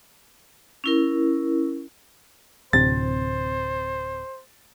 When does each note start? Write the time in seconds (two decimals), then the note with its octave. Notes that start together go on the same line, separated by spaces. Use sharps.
0.84 C#4 E4 A#4
2.73 D1 C3 C5 A6